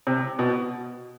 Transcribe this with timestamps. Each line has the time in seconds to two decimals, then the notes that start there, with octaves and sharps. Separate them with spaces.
0.07 C3
0.39 B2